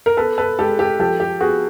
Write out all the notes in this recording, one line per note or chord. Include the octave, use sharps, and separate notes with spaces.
A#4
B3 A4 B4
A4 B4
G#3 G4 A4
G4 A4
F3 G4 A4
G4
B3 F#4 G#4